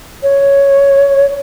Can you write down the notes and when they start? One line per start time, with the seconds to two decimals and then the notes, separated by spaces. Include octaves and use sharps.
0.22 C#5